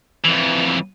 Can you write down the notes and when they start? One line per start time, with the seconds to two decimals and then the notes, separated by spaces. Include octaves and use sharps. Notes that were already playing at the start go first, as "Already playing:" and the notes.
0.25 F2 E3